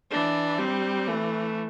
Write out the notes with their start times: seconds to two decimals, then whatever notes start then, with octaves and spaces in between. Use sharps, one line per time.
0.11 E3 D4
0.59 G3 C4
1.07 E3 A3